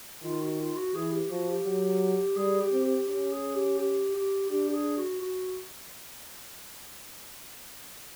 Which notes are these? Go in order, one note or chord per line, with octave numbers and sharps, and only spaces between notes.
D#3 F4
F#4
F4
F#4
E3 G#4
G4
F3 F#4
G4
F#3
G3 G#4
G4
C4
G4
C#4 G4
G#4
G4
G4
G4
D4 G4
G4
G#4
F#4
F#4